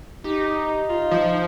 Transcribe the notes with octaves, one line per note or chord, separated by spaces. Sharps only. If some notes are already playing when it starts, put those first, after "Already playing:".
D#4 G4
F4
F3